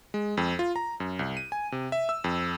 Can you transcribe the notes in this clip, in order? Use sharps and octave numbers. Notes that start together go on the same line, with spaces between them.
G#3
F2
F4
A#5
F#2
C2
D#7
G#5
C3
E5
E6
F2